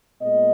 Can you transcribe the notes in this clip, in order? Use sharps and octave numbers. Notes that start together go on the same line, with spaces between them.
A#2 G#3 B3 D#5